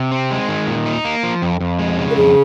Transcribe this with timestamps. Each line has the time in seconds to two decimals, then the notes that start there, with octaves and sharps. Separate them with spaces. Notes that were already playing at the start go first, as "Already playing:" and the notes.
Already playing: C3
0.12 C4
0.31 G#3
0.48 D#3
0.67 A#2
0.86 D#4
1.05 A#3
1.23 F3
1.42 F2
1.60 F2
1.79 G#3
1.98 C#3
2.10 A#4
2.16 F2 G#4